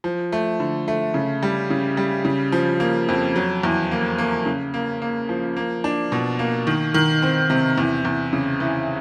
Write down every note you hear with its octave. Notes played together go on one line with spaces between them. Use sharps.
F3
A3
D3
A3
C#3
G3
C#3
G3
C#3
F3
A#3
F2
F#3
E2
A#3
A#3
C#3
A#3
A#3
F3
A#3
D4
B2
A#3
D#3
D#3
C4
C3
E2
E2
C#3
E3